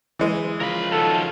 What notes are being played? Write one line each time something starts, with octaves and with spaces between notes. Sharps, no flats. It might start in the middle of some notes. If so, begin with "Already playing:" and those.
E3 G#3
C#3 F3 F4 A#4 B5
D#3 F#4 A4